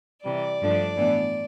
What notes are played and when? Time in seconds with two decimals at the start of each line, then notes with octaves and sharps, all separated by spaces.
0.24 C3 E3 G3 D5
0.60 G2 F3 A3 D4
0.96 A2 E3 B3 D4